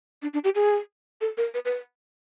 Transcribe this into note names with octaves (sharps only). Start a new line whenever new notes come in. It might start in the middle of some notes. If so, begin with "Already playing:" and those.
D4
D4
G4
G#4
A4
A#4
B4
B4